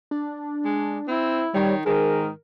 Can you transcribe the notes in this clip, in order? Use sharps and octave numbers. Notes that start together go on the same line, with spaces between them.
D4
G#3
C4 E4
D#3 G3 C#5
G#2 D#3 G#4 A#4